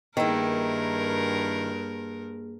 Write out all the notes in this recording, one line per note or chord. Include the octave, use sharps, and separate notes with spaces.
G2 D#3 A#3 E4 G#4 A#4